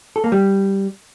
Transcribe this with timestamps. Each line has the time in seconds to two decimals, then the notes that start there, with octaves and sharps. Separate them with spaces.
0.16 A4
0.24 A#3
0.32 G3